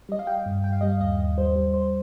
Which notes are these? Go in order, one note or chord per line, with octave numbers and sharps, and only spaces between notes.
G3 D#5
F5
G3 G5
G2
G2 G5
F5
G3 D#5
F5
D#2 D#5
D#2
G3 C5
G3
G3 C5